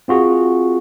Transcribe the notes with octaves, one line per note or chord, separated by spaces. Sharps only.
C4 F4 F#4 G#4